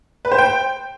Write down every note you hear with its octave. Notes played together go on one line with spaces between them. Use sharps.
B4
C5
G5